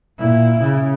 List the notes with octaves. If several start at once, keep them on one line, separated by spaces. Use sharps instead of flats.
A#2 E4
C#3